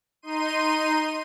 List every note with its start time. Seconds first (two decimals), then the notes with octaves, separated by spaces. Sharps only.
0.22 D#4 C6 D#7